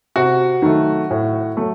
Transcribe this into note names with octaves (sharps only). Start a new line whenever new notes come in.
C3 F#4
D#3 F#3 A3
A2
F#3 A3